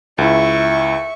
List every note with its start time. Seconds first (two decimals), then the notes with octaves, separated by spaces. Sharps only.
0.18 C#2 E4 E5 C#6